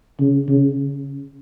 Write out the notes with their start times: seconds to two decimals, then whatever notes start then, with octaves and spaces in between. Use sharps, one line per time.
0.20 C#3
0.48 C#3